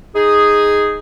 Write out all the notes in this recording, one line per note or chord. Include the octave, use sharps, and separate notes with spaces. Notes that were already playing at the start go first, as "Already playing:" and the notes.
D#4 G#4